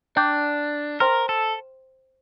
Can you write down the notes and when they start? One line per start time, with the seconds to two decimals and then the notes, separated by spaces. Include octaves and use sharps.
0.16 D4 D5 G5 D6 G6
1.00 A#4 C5 G5 C6 F6
1.29 A4